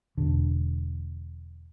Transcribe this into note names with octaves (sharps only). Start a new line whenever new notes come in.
E1 D3